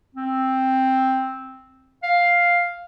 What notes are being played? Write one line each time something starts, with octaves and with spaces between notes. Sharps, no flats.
C4
F5